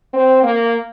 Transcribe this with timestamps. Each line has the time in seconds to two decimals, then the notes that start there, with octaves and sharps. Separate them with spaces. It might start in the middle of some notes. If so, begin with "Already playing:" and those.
0.13 C4
0.43 A#3